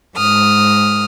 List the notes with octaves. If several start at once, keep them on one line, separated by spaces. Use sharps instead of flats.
G#2 D#6 F6